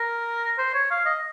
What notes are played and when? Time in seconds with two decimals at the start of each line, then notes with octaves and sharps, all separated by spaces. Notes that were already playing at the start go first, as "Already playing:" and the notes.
Already playing: A#4
0.58 C5
0.74 C#5
0.91 F5
1.06 D#5